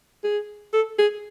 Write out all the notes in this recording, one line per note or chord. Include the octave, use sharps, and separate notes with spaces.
G#4
A4
G#4